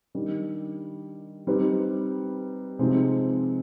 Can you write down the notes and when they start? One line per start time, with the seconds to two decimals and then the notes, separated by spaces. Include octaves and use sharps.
0.15 D#3 G3 D4
1.47 G3 C4 D#4 G4 B4
2.79 C3 F3 G#3 C4 D#4